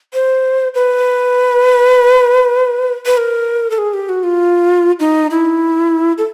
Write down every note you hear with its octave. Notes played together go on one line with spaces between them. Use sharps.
C5
B4
B4
A#4
A4
G#4
G4
F#4
F4
D#4
E4
A4